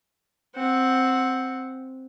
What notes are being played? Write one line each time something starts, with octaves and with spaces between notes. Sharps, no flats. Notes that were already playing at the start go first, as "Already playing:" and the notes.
C4 F#5